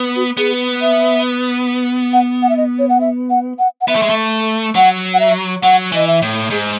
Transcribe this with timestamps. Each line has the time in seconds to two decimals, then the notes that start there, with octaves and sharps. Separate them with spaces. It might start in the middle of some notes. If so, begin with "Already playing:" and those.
Already playing: B3
0.16 F#4
0.37 B3 G#4
0.81 E5
2.13 F#5
2.42 F#5
2.49 E5
2.57 D#5
2.79 C#5
2.89 F#5
3.01 E5
3.30 F#5
3.59 F#5
3.81 F#5
3.88 B3 E5
3.96 A3
4.02 G#3
4.09 A3
4.75 F#3 F#5
5.14 F#5
5.20 E5
5.63 F#3 F#5
5.92 E3 D#5
6.07 E5
6.22 A2
6.50 G#2 G#4